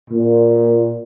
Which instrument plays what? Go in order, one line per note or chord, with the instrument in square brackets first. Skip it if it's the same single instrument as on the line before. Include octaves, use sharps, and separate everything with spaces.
[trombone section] A#2